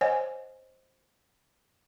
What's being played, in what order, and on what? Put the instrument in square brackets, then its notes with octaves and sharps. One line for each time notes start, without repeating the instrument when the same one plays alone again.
[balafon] C5 C#5 D#5 F#5 G#5